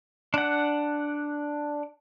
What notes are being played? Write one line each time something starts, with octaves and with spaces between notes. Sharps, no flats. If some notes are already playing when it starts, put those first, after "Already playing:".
D4 F#5